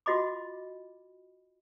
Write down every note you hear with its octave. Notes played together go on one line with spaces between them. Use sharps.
F4 F#4 D#5 B5 D6